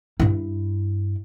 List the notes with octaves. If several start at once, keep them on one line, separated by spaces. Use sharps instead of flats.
G2 E4